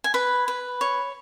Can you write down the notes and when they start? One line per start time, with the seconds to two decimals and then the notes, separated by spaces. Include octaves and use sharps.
0.04 G#5
0.14 B4 B5
0.48 B4
0.81 C#5